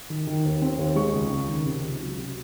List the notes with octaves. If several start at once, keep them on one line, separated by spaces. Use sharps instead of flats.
D#3
D#3
D#2
C4
D#2
G#3 C#6
C#2
C#3
D#3
C3
C#2
F#3
C3